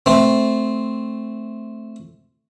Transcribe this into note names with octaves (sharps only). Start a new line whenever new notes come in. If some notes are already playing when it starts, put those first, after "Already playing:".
A3 C4